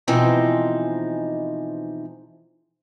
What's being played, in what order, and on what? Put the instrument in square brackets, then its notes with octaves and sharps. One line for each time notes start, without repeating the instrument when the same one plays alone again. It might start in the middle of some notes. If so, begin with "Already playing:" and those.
[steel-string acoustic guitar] B2 E3 F3 G#3 C4 D#4